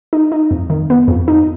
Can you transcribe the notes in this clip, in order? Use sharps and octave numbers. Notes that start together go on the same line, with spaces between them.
D#4
D#4
F2
D#3
B3
F2
D#4